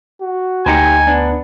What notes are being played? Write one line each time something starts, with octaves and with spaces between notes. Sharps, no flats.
F#4
D2 D#4 G4 C5 G#5 A#5 C#7
B3 D4